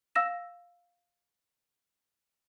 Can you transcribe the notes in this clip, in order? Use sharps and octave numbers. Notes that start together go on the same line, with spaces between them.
F5 E6 A#6 E7